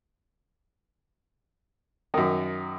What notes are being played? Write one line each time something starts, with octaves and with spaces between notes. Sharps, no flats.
F#2 D#3